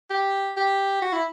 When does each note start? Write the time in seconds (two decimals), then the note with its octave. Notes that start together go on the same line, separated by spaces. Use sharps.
0.10 G4
0.57 G4
1.02 F#4
1.13 E4